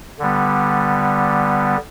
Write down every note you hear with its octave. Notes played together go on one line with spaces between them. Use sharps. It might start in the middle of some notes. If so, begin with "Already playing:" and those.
D3 G3 B3